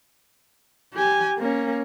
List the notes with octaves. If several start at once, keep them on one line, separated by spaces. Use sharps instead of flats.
G4 G#5
A#3 C#4